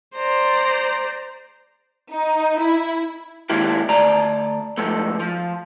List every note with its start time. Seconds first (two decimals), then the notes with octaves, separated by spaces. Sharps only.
0.15 C5 D5 A#5
2.11 D#4
2.60 E4
3.50 D#3 G#3 A#3 E4 G4
3.89 D2 D5 A#5
4.77 G#2 F3 A3
5.20 F3